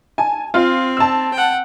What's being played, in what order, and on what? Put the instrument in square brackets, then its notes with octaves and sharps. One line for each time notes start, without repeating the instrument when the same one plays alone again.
[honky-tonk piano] G#5 A5
[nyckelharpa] C4 [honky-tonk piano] F4
[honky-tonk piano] A5 E6
[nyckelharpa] F#5 G5